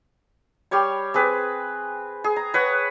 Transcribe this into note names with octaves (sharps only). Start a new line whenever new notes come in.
G3 G4 C#5 C6
C4 G#4 B4
G#4
A#5
B4 C#5 F#5